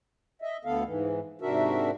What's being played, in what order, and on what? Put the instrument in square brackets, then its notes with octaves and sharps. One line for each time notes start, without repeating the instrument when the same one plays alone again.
[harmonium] D#5 E5
D2 D3 B3 A4 F5
G#2 E3
G#2 C3 D4 F#4 A#4 E5